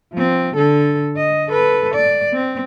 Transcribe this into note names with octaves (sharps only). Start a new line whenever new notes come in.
F3 C4
D3 A4
D#5
A4 B4
D5
C4